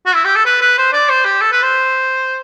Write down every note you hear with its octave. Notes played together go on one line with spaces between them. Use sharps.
F#4
E4
G4
A4
B4
B4
C5
D5
C5
G4
A4
B4
C5